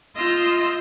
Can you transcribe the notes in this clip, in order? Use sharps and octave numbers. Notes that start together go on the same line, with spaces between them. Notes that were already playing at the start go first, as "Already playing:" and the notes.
F4 D#5 E6 G6